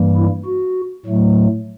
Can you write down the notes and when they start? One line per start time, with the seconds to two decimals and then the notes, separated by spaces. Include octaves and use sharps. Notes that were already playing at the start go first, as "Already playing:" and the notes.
Already playing: G2 E3 G3 A#3
0.16 E4
0.46 F#4
1.06 A2 F#3 A3